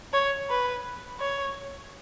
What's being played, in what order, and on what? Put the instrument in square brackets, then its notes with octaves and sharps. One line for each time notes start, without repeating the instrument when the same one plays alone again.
[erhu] C#5
B4
C#5